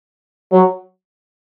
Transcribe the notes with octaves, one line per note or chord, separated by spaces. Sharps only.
F#3